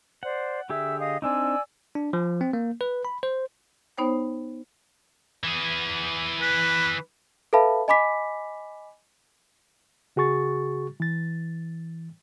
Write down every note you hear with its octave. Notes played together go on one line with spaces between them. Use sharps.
C5 D5 F#5
D3 G4 G#4 E5 E6
D#5 F5 D#6
C4 D4 D#4 D5 G#5 E6
D4
F3
C4
A#3
B4
B5
C5
B3 D#4 C5 C#5 G5
E3 G#4
B4
A4 B4 E5 F5 A5 B5
D#5 G#5 B5 D6 B6
C#3 F#4 G#4 C#6 A6
E3 A6